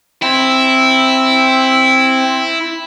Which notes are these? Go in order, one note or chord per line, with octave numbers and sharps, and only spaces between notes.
C4 E4